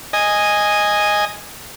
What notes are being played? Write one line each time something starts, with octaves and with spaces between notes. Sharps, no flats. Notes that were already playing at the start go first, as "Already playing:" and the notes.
D#5 G#5